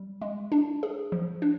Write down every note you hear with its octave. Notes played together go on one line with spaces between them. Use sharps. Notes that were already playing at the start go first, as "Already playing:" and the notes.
Already playing: G3
G#3
D4
G#4
F3
D4